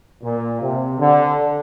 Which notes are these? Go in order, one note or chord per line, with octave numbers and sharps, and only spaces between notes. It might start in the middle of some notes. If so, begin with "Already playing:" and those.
A#2
C3
D3